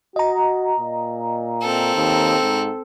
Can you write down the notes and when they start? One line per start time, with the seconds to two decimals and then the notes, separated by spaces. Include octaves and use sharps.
0.16 F#4 D#5 A#5
0.80 A#2
1.62 C4 A4
1.95 D#2
2.43 G#2